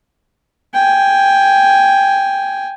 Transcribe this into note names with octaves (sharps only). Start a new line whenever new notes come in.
G5 G#5